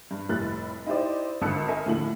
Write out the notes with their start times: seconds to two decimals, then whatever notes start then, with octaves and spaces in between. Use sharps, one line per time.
0.11 G2
0.29 F1 A2 G3 F#6 A6
0.87 D#4 E4 G4 C5 D5
1.42 G#1 D3 A5 E6 F#6 C#7
1.67 A4 A#4 D#5 E5 G#5
1.86 D#2 A2 D3 F3 A3 F#7